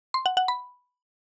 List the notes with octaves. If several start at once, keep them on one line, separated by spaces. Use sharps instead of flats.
C6
F#5
F#5
B5